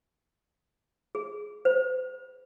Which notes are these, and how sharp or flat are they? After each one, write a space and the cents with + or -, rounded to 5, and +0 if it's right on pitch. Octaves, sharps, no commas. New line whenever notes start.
G#4 +5
C5 -40